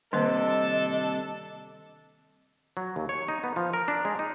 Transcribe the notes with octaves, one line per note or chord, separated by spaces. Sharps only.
G2 C3 D#3 A#3 D4 A4 C5 D#5
F#3
D#2
C#5
D#4
B3
F3
A#4
D4
G#3
D#4